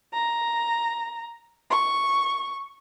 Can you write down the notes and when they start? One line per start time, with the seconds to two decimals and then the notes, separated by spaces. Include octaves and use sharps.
0.13 A#5
1.70 C#6